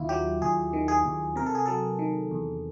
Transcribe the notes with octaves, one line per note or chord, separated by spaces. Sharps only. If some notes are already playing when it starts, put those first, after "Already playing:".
Already playing: D#2 D#3 E4 F4
F#3 G4
D#2 G#4
D#3
G#4
D#2
C3 A#4
A4
G#4
F#3 A4
D#3
E2